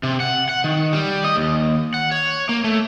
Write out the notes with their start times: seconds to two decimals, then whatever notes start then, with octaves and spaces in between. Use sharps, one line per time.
0.03 C3
0.20 F#5
0.49 F#5
0.64 D#3
0.93 G3
1.24 D#5
1.36 D#2
1.94 F#5
2.12 C#5
2.49 A#3
2.64 A3